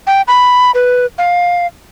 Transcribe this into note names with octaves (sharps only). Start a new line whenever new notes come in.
G5
B5
B4
F5